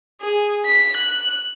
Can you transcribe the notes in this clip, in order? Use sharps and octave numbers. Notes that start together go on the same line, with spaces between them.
G#4
B6
F#6